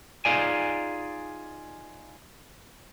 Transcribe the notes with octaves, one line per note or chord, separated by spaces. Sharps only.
D#4 F4 G#4 D5 G#5